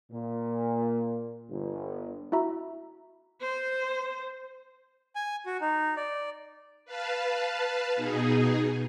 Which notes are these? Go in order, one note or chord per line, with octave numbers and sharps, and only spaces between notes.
A#2
G1
E4 F#4 E5 A#5
C5
G#5
F#4
D#4
D5
B4 F5 A5
B2 D#4 G#4